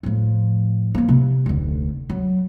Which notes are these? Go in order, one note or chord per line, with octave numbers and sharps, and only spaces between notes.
A2 F3
F3 A#3
C3
F1 D2
F#3